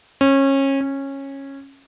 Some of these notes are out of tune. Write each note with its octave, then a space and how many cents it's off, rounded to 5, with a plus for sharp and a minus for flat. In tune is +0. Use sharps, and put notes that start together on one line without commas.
C#4 -25
C#4 -15